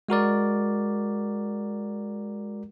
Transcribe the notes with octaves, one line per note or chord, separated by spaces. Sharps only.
G#3 F#4 A#4 D5